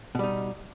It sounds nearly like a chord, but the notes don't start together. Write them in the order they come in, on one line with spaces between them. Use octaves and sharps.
B2 G3 D#4